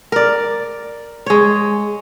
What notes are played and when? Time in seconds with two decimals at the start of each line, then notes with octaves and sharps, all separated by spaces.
0.12 A#4 D5
1.26 G#3 C#5